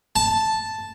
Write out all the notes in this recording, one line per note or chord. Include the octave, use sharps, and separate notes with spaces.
A5